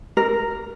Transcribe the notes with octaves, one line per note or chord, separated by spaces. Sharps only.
A#4